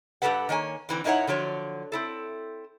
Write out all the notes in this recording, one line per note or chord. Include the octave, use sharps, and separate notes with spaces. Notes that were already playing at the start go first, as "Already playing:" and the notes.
G2 F#3 G4 A4 B4 F#5
D#3 A#3 C#5 G#5
D3 E3 C4
F#2 D#4 E4 A#4 C#5 F#5
D3 F3 F#3 C#5
C4 E4 A4